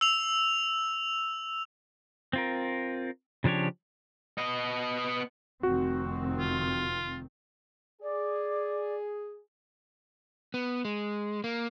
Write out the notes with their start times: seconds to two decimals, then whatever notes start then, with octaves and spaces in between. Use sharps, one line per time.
0.01 E6 F7
2.33 C4 F4 A#4
3.44 C#3 F3 D4 G4 C#5
4.38 B3 D#5
5.63 F1 D#3 C4 F#4
6.40 F4
8.02 G#4 D5
10.54 B3
10.85 G#3
11.44 A#3